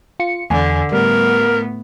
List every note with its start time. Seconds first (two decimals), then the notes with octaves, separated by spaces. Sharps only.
0.20 F4 C#7
0.50 E2 D3 G#5
0.92 A2 G3 B3 A#4